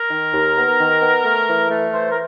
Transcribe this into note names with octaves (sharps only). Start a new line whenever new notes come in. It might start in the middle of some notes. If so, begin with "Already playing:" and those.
Already playing: A#4
D#3
D#2
B3
D#3
B3
A3
E3
A3
E3 C5
A#4